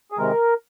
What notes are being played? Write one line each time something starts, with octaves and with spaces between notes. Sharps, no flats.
G#4
C3 D#3 G#3 A#4